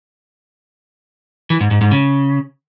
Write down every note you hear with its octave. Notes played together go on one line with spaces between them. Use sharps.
E3
G#2
G#2
G#2
C#3